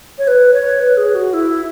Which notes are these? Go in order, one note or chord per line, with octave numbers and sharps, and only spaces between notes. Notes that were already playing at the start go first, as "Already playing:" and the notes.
C#5
B4
C#5
B4
G#4
F#4
E4